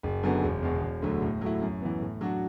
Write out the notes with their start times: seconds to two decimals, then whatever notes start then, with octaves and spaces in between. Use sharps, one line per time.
0.03 F#1
0.23 F#2 D3 F#3 B3
0.43 E1
0.62 E2 B2
0.82 E1
1.02 D2 D3 F#3 A3
1.22 A2
1.41 F#3 A3 E4
1.62 F#2
1.81 E3 B3
2.01 A2
2.21 F#3 D4 F#4